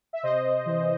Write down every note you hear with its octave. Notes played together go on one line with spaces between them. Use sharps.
E5
C3 C5 D#5
C3
E3